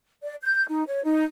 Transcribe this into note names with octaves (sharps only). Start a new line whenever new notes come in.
D5
G6
D#4
C#5
D#4